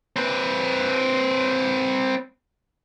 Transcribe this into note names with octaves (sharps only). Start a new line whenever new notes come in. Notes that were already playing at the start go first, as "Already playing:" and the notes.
C4 B4